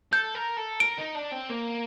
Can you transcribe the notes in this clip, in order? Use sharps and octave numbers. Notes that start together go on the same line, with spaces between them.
A4 G6
A#4
A4
A#4 D7
D#4
D4
C4
A#3